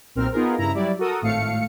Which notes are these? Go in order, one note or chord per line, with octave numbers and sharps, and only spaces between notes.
B1 A#2 C4 A#4 F6
B3 D#4 F4 G#4 A#4
G2 C#3 E4 A#5
F#3 G3 E4 D5
F#4 A4 A#4 D#6
G#1 A2 A3 F5 C#7